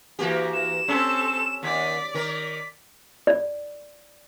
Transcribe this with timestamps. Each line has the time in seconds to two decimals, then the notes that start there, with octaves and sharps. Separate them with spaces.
0.19 E3 A#3 F#4 G4
0.53 E7
0.88 C4 C#4 A4
1.63 D#2 D5 B6
2.14 D#3 A#4 B6
3.27 D5